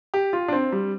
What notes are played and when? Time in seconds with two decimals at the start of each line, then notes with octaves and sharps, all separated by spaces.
0.14 G4
0.33 F4
0.48 D4
0.53 C4
0.72 G3